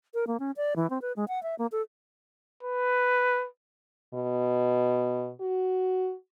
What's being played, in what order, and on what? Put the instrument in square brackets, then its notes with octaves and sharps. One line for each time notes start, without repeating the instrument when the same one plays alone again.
[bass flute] A#4
A#3
C#4
D5
E3
C4
B4
G#3
F#5
E5
A#3
A4
[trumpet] B4
[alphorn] B2
F#4